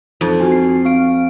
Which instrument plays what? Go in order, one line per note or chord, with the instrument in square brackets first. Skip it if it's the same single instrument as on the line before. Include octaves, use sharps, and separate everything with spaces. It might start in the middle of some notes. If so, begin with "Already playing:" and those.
[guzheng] F2 [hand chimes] D#4 F4 C5
[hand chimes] C4 F#4 G#5
C7
C4 F5 D7